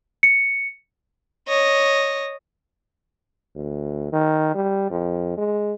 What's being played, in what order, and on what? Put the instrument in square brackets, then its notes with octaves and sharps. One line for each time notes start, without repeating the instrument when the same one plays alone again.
[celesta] C#7
[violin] C#5 D#5
[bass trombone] D2
D#3
G3
F2
G#3